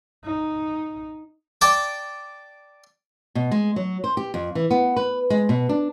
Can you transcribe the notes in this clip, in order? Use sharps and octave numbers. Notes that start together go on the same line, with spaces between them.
D#4
D5 G5 A5 D6
B2
G#3
F#3
C5
G4
F2
E3
B3
B4
G#3
B2
D4